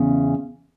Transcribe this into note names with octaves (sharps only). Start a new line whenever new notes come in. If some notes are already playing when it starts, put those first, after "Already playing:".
Already playing: E2 C#3